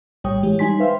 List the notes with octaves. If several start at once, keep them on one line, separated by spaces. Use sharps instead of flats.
A#1 A2 G3 C#5 G5 D#6
E3 G#3 G4 C#5
G3 D#4 G#5 C6 B6
B4 C5 E5 F5 G5 C6